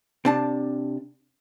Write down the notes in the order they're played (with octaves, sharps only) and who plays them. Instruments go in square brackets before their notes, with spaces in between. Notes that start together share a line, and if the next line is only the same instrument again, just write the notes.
[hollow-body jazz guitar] C3 D4 A5